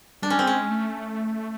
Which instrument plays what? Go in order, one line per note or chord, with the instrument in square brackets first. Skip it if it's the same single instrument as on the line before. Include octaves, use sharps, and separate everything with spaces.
[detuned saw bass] G3 [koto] D4
[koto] C#4
[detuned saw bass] G3 [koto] C4
[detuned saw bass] G#3 [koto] C#4
[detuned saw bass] A3